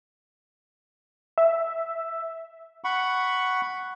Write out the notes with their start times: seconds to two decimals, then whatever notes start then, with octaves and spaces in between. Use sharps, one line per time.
1.38 E5
2.84 F#5 B5 C#6